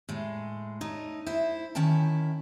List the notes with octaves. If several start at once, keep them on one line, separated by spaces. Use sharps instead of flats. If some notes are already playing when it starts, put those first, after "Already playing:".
A2 G#3
A3 D#4 C#5
E4 C5
D#3 C#4 E4 G5 A5